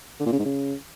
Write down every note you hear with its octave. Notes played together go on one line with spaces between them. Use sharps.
D3
A#2
C#3
G#2
C#3